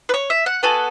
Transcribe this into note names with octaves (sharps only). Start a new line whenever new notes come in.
B4
C#5
E5
F#5
B3 F#4 A4 G#5